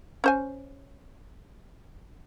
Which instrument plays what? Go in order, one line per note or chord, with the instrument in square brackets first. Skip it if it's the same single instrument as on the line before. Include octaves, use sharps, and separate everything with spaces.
[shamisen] C#4 C5 G#5